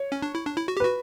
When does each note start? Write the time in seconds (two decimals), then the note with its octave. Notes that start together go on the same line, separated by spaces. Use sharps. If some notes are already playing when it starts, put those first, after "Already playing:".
Already playing: C#5
0.12 C#4
0.22 D4
0.35 E4
0.46 D4
0.57 E4
0.68 F#4
0.77 G4
0.80 B4
0.85 F#4